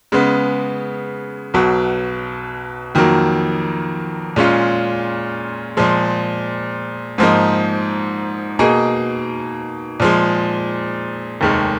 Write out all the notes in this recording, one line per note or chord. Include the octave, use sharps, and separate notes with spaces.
C#3 G#3 B3
B1 B2 F#3
F2 D#3 F#3 A#3
A#2 G#3 C#4 F4
A#2 F3 G#3
G#2 F3 A#3 D#4
B2 A#3 D#4 G#4
A#2 F3 G#3
F1 D#2 D#3 G#3